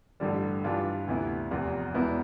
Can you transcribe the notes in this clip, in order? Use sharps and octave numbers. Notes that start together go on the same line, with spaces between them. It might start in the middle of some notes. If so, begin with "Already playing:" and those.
A1 G2 D3 G3
G2 E3 G3 D4 F4
D2 C3 E3 B3 E4
F1 E2 C3
E1 E2 B2 B3 E4